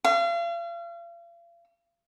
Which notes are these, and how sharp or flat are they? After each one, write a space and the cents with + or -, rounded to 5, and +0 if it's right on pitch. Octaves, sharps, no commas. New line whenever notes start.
F5 -40